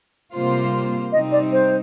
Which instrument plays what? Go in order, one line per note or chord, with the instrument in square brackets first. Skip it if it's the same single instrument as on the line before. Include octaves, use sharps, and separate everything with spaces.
[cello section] C3 G3 A#3 F4 C5
[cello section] C3 G3 C4 D#4 [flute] D#5
[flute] D5
C5